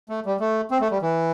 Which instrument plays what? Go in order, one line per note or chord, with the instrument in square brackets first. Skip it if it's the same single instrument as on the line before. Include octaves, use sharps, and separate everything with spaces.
[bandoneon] A3
G3
A3
C4
A3
G3
E3